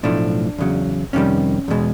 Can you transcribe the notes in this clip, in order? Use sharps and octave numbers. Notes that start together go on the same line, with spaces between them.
B1 A2 F3 A3 D4
E2 C#3 F#3
F2 C3 D#3 G3 C#4
E2 B2 G#3